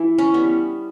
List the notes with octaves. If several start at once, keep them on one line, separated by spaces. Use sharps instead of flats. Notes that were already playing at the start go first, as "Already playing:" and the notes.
Already playing: E3 E4
C#4
G3 B3